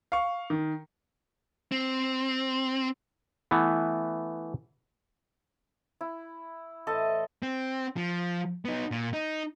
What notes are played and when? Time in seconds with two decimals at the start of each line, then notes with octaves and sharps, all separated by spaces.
0.12 F5 C#6
0.50 D#3
1.72 C4
3.51 E3 A3 B3
6.01 E4
6.87 A2 E3 A4 C5 D#5 A5
7.43 C4
7.96 F3
8.65 B3 D#4
8.91 A#2
9.13 D#4